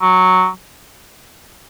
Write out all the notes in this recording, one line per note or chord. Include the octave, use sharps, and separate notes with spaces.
F#3